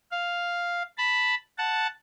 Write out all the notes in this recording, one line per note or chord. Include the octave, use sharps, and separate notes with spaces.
F5
A5 B5
F#5 A5